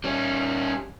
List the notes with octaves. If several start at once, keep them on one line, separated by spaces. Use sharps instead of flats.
G3 C#4